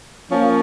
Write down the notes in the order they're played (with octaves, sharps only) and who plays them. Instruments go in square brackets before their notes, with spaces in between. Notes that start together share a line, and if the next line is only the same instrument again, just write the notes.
[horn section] F3 A#3 C#4